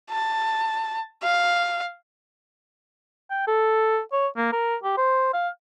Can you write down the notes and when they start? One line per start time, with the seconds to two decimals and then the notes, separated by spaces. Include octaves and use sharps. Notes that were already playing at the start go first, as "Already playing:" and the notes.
0.11 A5
1.23 F5
3.31 G5
3.47 A4
4.13 C#5
4.37 A#3
4.53 A#4
4.83 G4
4.97 C5
5.34 F5